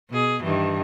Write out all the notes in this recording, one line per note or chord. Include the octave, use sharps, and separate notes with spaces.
B2 G#4
G2 D#3 E3